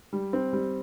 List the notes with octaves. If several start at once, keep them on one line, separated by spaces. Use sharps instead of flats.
G3
C4
G3